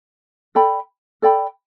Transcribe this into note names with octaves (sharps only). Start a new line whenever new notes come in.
A4 D5 G5 B5
A4 D5 G5 B5